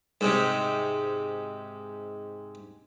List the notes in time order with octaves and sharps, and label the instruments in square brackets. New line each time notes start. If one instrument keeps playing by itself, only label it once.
[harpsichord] G#2 C3